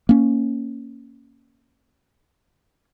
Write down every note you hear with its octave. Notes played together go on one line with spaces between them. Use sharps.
A#3 C#4